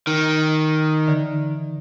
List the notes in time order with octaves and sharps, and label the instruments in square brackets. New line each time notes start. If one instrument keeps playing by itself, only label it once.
[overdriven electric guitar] D#3
[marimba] D3 E3 D#4